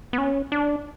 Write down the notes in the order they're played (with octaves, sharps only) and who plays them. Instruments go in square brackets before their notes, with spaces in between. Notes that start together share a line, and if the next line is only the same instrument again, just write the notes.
[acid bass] B3
C#4
D4